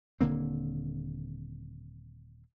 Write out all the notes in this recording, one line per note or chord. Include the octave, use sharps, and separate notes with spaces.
D#1 D3 A#3 C4